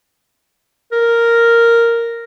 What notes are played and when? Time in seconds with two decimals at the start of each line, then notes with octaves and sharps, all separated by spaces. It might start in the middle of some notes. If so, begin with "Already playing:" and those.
0.92 A#4